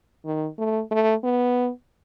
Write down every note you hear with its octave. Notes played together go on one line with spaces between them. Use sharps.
D#3
A3
A3
B3